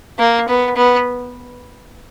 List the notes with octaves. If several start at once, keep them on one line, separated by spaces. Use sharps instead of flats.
A#3
B3
B3